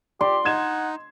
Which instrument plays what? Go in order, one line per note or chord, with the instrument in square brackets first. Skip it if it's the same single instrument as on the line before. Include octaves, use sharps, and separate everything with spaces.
[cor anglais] G4 [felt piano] D5 [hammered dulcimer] C6
[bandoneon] D#4 [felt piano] D#5 G#6 E7 [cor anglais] F#5